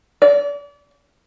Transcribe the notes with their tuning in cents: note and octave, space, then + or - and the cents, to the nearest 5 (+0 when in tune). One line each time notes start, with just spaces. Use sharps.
D5 -35